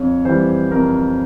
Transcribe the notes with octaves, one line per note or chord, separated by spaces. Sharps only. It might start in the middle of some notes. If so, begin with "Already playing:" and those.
Already playing: F2 C#5
E3 G3 C5
F2 A#4